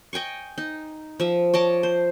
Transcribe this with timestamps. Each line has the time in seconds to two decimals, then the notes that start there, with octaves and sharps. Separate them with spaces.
0.13 D#5 G5 G#5 C#6
0.58 D#4
1.20 F3 E5
1.54 C#5 D#5 A5 D6
1.83 C5